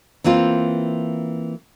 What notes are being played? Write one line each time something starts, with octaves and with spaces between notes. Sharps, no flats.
E3 A#3 C4 F4